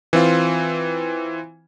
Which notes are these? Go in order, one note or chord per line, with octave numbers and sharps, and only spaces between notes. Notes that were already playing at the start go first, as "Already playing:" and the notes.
E3 C4 F4